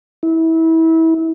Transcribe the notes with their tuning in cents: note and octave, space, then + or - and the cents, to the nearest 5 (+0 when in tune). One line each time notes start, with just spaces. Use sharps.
E4 -25